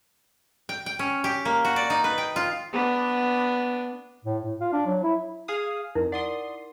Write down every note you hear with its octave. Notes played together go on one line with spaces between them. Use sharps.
G5
G5
C#4
G4
A#3
F#4
D5
D#4
B4
G5
F4
B3 D4
A2
A2
F4
D4
F#3
E4
G#4 F5 D#6
F2 D#4 E4 A#4
D5 F#5 C6 D#6